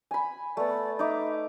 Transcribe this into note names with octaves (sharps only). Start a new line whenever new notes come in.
G#5 B5
A3 B3 D5
D#4 E5 D6